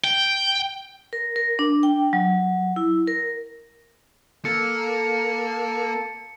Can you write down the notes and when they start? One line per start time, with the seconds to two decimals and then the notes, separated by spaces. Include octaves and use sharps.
0.04 G5
1.13 A#4
1.36 A#4
1.59 D4
1.83 G5
2.13 F#3
2.76 E4
3.07 A#4
4.45 A#3 A4 C#7